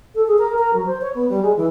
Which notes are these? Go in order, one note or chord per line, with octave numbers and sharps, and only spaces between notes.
A4
G#4
A#4
A#4
F#3
C5
C#5
B3
G3
G#3
E3